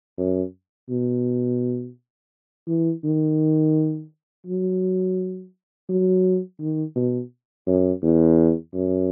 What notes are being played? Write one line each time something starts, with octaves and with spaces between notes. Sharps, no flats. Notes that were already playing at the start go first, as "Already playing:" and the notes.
F#2
B2
E3
D#3
F#3
F#3
D#3
B2
F#2
E2
F#2